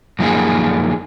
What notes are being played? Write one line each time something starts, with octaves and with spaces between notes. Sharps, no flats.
F#2 F3 A#3 D#4 G#4